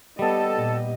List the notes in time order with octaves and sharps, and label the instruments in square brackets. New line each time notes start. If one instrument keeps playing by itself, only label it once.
[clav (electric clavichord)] G3 B3 [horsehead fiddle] G4 D#5 [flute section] A4
[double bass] A#2